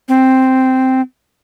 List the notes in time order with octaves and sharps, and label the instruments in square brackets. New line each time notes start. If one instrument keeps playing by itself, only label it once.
[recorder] C4